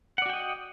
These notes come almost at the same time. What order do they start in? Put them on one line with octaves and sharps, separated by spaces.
F#5 D5 F#4 G5 D#5